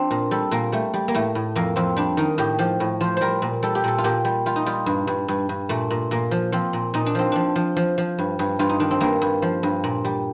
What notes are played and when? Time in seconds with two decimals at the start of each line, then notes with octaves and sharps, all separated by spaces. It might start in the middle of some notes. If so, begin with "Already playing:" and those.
Already playing: F3 C4 D4
0.11 A#2
0.31 G3 A4
0.51 A#2 A#3
0.72 G3 A3
0.94 G3
1.08 A#3
1.15 A2 A3
1.35 A2
1.55 F2 A#3
1.76 F2 C4
1.96 G3 D4
2.17 D#3 D#4
2.38 A2 G4
2.59 F3 G4
2.80 A2
3.01 F3 C5
3.17 G3 A#4 C5
3.42 A#2
3.63 G3 A4
3.75 G4
3.84 A#2 A4
3.98 F4
4.04 A#2 G4
4.25 G3
4.46 G3 F4
4.56 D#4
4.66 G3 F4
4.86 G2
5.07 G2
5.28 G2
5.49 G2
5.69 A#2 A3
5.91 A#2
6.11 A#2 A#3
6.31 F3
6.52 F3 C4
6.73 A#2
6.94 A#2 D#4
7.06 D4
7.15 F3 C4
7.32 F3 D4
7.56 F3
7.77 F3
7.98 F3
8.18 G2
8.39 G2
8.59 G2 F4
8.69 D#4
8.80 D#3 D4
8.91 C4
9.00 G2 A#3
9.22 G2
9.42 F3
9.63 G2
9.84 A#2
10.05 G3